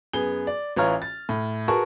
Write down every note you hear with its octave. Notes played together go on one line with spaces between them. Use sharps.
F#2 B3 G#4 G7
D5
A1 E3 F4 C#5 A#5 F6
A6
A2
F#4 G#4 A#4 B4 A5 C#6